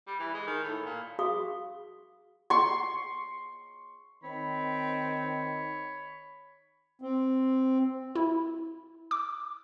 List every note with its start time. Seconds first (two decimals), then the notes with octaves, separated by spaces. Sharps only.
0.07 G3
0.19 E3
0.34 G#3
0.47 D#3
0.64 A2
0.86 A#2
1.19 F#4 G#4 F5 C#6 D#6
2.50 C6 C#6
4.24 D#3 C4 C#5 B5
7.02 C4
8.15 E4
9.11 D6